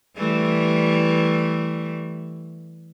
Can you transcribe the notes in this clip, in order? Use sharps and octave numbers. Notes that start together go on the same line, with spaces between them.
E3 G3 A3